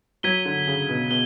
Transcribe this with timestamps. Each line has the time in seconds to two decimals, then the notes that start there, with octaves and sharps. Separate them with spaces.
0.23 F#3 G#6 B6 D#7 G7
0.45 D3
0.67 C#3
0.89 B2
1.10 B2 G7